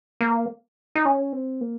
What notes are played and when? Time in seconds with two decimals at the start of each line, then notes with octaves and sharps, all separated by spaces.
0.21 A#3
0.95 D#4
1.05 C#4
1.33 C4
1.61 A#3